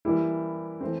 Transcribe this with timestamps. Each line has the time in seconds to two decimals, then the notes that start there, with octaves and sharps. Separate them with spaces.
0.05 E3 G3 A#3 E4 G4
0.81 E3 A3 C4